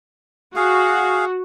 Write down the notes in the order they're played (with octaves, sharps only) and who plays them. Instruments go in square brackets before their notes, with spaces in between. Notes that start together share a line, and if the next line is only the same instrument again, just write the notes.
[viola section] F#4 [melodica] G#4 F5